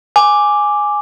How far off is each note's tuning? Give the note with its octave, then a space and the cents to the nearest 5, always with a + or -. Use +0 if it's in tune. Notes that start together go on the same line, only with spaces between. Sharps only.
G#5 +0 D6 +0